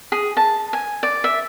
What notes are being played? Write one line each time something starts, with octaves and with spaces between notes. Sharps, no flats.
G#4
A5
G#5
D5
E5